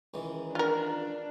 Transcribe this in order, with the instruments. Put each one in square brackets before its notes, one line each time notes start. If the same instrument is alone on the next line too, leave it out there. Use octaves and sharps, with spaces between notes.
[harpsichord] C#2 D#3 E3
[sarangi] D4 [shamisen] F4 A#4